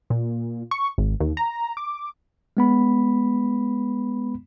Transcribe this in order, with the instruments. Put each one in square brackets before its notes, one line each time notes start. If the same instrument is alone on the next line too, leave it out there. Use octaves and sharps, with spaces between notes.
[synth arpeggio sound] A#2
C#6
G#1
D#2
A#5
D6
[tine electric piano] G#3 B3 B5